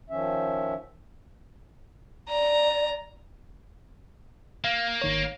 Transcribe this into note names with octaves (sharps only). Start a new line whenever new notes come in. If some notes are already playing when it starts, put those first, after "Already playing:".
D#3 F3 C#4 E5
D5 A#5
A#3 F5
G#1 D#3 C#5